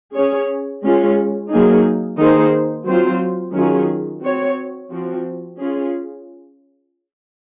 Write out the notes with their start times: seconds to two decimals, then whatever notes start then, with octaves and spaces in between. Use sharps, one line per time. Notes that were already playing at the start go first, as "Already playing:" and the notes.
0.14 C#4 G#4 C#5
0.83 G#3 C#4 F4
1.51 F#3 A#3 D#4 G#4
2.18 D#3 A#3 D#4 G#4 C5
2.86 F#3 C4 F4 C5
3.54 D#3 F#3 C#4 F4 G#4
4.22 C4 F#4 C#5
4.90 F3 C4 F#4
5.57 C#4 F4 G#4